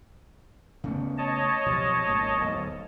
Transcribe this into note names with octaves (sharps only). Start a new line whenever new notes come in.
C#3 A3 B3
C#5 D#5 A5
B1 C3 F3
A1 G#2 A#3
D1 B1